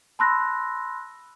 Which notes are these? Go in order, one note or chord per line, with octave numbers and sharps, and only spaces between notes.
A5 B5 C6 E6 F#6 A#6